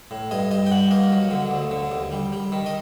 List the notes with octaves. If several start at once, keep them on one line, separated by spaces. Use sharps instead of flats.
A2
G2 D#5
G2 D#5
G5
G2 F#5
A#3 D#5
F#3
D3
D2
D3
D#2
G3
G3
D#3
D#5